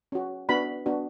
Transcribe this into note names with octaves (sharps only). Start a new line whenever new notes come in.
C#4 F#4
B3 D4 F#4 B5
B3 D4 F#4